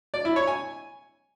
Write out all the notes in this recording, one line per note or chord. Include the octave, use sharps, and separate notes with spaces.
D5
E4
C#5
G#5